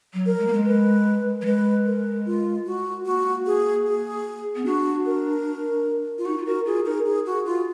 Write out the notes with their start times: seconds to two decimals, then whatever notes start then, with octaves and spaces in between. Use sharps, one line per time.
0.14 F#3
0.26 A#4
0.39 G#3
0.47 A#3
0.53 G#3
0.66 B4
1.42 F#3
1.46 G#3 B4
1.86 A#4
2.26 F4
2.66 F#4
3.05 A#3 F#4
3.46 G#4
3.86 G#4
4.56 B3
4.65 D4 F#4
5.06 A#4
6.18 F4
6.25 D#4 F#4
6.38 F4
6.46 F#4 A#4
6.66 F4 G#4
6.86 D#4 A#4
7.06 G#4
7.26 F#4
7.46 F4